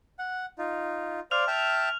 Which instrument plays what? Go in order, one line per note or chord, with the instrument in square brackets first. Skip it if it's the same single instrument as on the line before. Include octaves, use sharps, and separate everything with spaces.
[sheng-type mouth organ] F#5
D#4 F4
[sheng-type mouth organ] C5 D5 F5 [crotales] F6 F7
[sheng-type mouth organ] E5 G5 A5